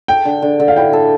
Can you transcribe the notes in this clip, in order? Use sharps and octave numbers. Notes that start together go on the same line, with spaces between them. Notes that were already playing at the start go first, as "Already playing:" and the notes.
A4 G5
D3
D3
D3
F5
E4 G5
A4